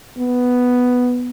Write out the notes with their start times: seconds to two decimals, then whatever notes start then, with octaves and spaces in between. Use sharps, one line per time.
0.18 B3